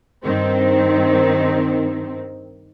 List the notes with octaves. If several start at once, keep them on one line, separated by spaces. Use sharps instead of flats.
G2 D#3 C4